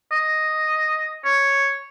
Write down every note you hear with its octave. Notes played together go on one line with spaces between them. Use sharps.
D#5
C#5